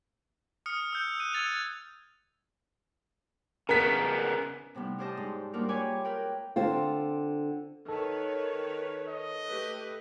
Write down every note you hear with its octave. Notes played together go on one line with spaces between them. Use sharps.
D#6 F6 C#7
E6 G6
F#6 G6 D#7
E6 G#6 A6 F7
C#3 B3 A#4 B6
A2 C3 G3 B3 D#4
C#4 G4 C5 D5 D#5 A5
G#2
G3 A#3 D4 F4 F#4 A#4
C#5 G5 G#5 B5 D6
A#4 B4 G5
D3 C4 F4
D#3 A4 B4 C#5
D#5
A3 G4 B4